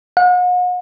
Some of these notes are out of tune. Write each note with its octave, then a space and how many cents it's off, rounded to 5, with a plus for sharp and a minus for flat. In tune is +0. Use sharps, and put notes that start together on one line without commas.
F#5 -45